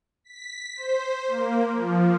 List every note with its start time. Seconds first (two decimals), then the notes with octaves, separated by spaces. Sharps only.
0.24 B6
0.76 C5
1.27 A#3
1.71 F3